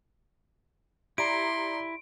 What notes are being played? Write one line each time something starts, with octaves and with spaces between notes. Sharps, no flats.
E4 G4 D5 A#5 C6 D7